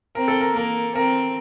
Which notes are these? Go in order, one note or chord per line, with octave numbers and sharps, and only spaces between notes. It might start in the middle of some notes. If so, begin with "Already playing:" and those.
C4 A#4
A4
A#4
A#3 A#4
C4 A#4